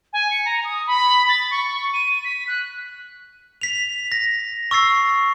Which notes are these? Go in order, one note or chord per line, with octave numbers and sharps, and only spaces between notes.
G#5
C#7
A#5
D#6
B5
A6
C#6
D#7
B6
F#6
B6 F7
A#6
C#6 E6 A6 C7